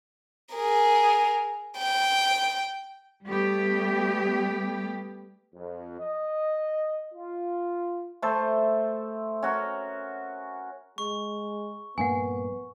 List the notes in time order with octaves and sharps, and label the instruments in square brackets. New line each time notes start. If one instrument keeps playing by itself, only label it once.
[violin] G#4 A#4
G5
[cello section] G3 A3 B3 G4
[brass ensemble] F2
D#5
F4
[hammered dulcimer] A3 C5 E5 A5
C#4 F#4 A#4
[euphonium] G#3 [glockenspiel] C#6
[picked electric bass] A#1 G2 A#3 [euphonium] B3 [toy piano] F#5 G#5